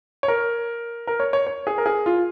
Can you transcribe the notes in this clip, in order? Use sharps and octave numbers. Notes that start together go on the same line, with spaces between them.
C#5
A#4
A#4
C#5
C#5
C#5
G#4
A#4
G#4
F4